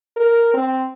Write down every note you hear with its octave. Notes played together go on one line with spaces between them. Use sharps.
A#4
C4